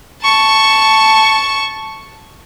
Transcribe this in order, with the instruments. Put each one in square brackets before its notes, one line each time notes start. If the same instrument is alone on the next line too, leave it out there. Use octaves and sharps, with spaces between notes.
[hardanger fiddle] A5 C#6